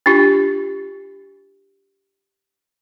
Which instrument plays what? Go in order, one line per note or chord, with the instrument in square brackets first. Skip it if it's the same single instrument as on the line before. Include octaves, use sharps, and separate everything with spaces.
[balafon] D4 F4 G4